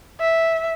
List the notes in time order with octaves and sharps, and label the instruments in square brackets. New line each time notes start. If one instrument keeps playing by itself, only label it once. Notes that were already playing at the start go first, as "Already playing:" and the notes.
[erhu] E5